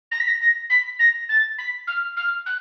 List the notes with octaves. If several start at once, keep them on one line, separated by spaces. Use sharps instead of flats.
A#6
B6
A#6
A#6
B6
A#6
A6
B6
F6
F6
F#6